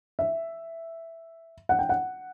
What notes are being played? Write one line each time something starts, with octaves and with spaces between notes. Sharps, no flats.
E5
F#5
G5
F#5